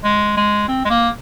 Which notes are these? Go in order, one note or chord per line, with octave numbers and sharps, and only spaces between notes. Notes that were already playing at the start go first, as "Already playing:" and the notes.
G#3
G#3
C4
G#3
A#3